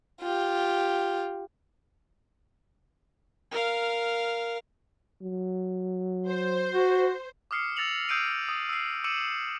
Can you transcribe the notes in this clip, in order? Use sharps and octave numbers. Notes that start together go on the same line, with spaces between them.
F4 G4
A#4 F5
F#3
C5
F#4
D6 D#6 F6 C7 C#7
E6 A6 A#6 C#7 F7 F#7
D#6 E6 G6 C7 D7 D#7
D#6
E6 C7
D6 E6 C#7 D#7 E7 F#7